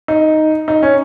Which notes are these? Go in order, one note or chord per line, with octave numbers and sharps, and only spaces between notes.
D#4
D#4
C#4